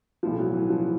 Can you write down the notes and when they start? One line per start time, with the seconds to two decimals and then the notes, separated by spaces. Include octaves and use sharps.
0.23 B1 A2 E3 F3
0.39 F#3
0.54 E3
0.70 F3